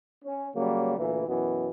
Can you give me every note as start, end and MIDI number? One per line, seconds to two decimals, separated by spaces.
0.25 0.47 61
0.56 0.97 49
0.56 0.97 54
0.56 0.97 55
0.56 0.97 58
0.98 1.27 38
0.98 1.27 46
0.98 1.27 52
1.28 1.68 42
1.28 1.68 47
1.28 1.68 52
1.28 1.68 59